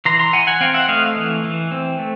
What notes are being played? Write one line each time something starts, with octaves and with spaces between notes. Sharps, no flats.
E3 A#5 C6
A#5 C6
E3 F#5 G#5
F#5 G#5
C4 F5 G5
E5 F#5
A3 D#5 F5
E3
E3
C4
A3